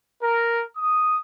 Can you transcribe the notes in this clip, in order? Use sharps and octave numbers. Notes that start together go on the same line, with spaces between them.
A#4
D#6